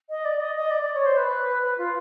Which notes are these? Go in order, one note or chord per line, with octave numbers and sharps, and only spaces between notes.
D#5
D5
D#5
D#5
D5
D5
C#5
C5
B4
B4
F4